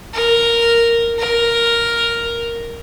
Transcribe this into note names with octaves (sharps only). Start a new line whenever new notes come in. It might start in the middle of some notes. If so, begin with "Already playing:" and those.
A#4
A#4